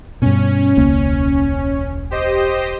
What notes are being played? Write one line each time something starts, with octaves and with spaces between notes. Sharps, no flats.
G2 B2 C#4
E1 C#2 A#3
G4 C5 D#5